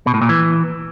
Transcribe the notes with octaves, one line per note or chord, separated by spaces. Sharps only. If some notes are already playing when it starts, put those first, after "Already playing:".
B2
A2
A#2
E3